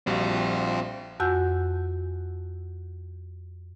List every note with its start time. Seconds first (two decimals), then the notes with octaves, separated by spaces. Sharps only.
0.07 A#1 G3 C4 F4 F#4
1.20 F2 F#4 F#5 G#5 E6 G6